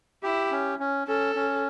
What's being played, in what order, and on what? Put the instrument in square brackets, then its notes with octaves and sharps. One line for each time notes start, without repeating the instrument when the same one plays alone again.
[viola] E4 [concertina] G4
[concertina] C#4
C#4
[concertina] C#4 [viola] A4
[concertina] C#4